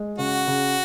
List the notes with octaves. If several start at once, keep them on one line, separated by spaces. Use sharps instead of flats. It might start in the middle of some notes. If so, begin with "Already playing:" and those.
Already playing: G#3
C#3 F#4
C#3